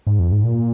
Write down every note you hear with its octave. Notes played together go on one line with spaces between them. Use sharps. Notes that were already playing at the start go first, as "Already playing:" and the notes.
G#2
F2
G#2
A#2